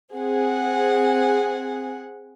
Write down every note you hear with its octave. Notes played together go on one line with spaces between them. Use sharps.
C4 G#4 F#5